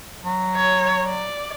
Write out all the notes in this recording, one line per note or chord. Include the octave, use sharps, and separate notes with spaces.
F#3
C#5
D5